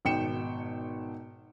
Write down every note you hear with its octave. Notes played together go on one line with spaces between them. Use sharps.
G#1 B2 G5 C#7 E7